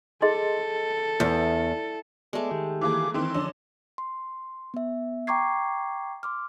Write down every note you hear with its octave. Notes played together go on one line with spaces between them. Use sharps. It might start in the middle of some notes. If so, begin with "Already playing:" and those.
G#4 A4 D#5 C6
E2
G#3 A3 B3 D5
D#3 G4
E3 A#3 G#4 D6
D#3 E3 C4 C6 D6
D3 F3 C#4 D4 D#5 E6
C6
B3 E5
G5 A#5 C#6 D6 G#6 C7
C6 D6 F6